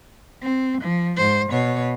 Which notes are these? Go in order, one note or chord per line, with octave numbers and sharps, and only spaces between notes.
C4
F3
G#2 C5
B2 C#5